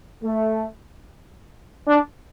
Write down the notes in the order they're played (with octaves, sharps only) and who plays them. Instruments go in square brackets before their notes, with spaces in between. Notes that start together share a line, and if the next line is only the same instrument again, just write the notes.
[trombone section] A3
D4